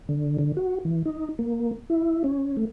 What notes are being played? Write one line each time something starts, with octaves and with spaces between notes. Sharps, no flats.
D3
D3
F#4
E3
D#4
A#3
E4
C#4
A3